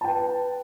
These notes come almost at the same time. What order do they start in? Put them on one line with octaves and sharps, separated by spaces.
A5 G5 B4